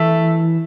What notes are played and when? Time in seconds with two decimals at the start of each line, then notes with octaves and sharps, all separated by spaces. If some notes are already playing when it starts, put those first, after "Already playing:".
Already playing: E3 A3